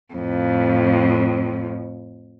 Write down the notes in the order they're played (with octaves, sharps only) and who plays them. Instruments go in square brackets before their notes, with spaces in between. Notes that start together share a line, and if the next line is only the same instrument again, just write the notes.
[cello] F2 A2